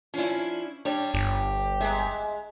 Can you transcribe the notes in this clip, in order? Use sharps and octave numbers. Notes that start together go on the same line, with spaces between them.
F3 C#4 D4 E4
G3 D4 C#5
G1 G4
G#3 E5 A#5